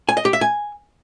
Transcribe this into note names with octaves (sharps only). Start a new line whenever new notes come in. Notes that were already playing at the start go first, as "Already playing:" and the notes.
G#5
D#5
G4
E5
G#5